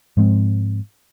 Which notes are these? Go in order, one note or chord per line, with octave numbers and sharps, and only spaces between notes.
G#2 F3 G#3 C4